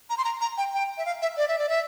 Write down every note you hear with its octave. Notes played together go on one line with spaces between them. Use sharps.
A#5
C6
A#5
A#5
G5
G5
E5
F5
E5
D5
E5
D5
E5